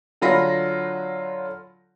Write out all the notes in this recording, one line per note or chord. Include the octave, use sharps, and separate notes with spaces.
D3 F#3 F4 B5 A#6